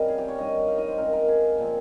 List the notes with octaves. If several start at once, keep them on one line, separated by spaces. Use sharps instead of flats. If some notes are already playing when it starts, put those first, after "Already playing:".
Already playing: C3 G3 C#4 A#4 D#5 F5
G#4
G4
C#5
G2 D#3 G3 D#5
F5
D#5
C5
C#3 G#3 C4 A#4
A#4
G#4
A#2 F3 C4